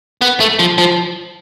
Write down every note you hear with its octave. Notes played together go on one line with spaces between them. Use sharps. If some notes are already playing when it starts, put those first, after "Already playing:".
B3
A3
F3
F3